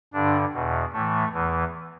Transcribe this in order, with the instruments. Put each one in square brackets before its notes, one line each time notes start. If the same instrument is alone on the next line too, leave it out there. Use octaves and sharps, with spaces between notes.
[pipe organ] G2 D3 D4
E2 B2
A2 E3 A3
E2 E3